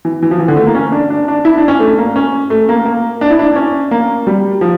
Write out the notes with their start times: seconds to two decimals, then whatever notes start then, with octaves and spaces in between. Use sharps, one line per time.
0.05 E3
0.22 E3
0.31 F3
0.39 E3
0.48 D3
0.57 A3
0.67 A#3
0.75 C#4
0.92 D4
1.10 D4
1.28 D4
1.45 E4
1.57 D4
1.68 C#4
1.80 A3
1.98 A#3
2.16 C#4
2.50 A3
2.69 A#3
2.86 A#3
3.21 D4
3.31 E4
3.39 D4
3.56 C#4
3.91 A#3
4.27 G3
4.61 F3